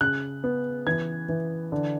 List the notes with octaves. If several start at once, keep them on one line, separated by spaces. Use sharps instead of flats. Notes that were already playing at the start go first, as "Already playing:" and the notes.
C#3 F#6
B3
E3 G#6
E3
D3